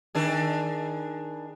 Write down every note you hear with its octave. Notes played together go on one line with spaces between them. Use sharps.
D#3 D4 G#4